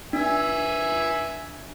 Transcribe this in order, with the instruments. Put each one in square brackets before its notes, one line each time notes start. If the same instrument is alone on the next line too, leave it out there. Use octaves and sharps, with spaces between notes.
[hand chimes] D4 [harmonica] E5 G#5